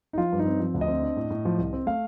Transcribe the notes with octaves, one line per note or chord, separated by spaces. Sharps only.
D#4
F3 F4
G2
D#4
C4
F3
D2
D#5
C4
D4
A2
A2
F3
C2
C4
A3 F5